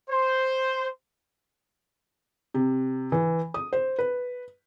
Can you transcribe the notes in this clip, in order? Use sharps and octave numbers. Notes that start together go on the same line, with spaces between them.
C5
C3
E3
D#6
C5
B4